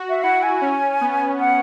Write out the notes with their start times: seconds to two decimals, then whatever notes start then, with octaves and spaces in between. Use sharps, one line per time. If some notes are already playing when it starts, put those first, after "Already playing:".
Already playing: F#4
0.10 E5
0.23 E4 F#5
0.43 G#5
0.61 C#4
1.01 B3
1.40 F#5